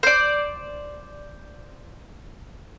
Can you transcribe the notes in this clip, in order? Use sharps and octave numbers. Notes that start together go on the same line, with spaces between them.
C5 D5